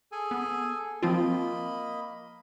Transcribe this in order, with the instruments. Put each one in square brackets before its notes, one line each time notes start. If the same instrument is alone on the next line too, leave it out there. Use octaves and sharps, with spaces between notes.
[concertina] G#4 A4 G#5
[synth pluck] B3
[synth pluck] F3 C4 F4 [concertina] A#3 D#5 B5